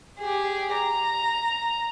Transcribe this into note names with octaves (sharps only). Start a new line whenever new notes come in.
G4 G#4
A#5